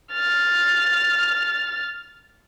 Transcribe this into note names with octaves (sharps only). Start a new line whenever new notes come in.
F6 A6